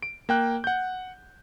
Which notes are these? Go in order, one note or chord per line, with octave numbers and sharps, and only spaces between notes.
D7
A#3 G5 F#6
F#5 G6